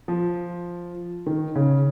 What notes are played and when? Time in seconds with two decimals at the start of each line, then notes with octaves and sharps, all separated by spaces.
0.08 F3
1.26 D#3
1.55 C#3